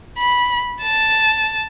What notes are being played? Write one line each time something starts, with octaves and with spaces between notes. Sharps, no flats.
B5
A5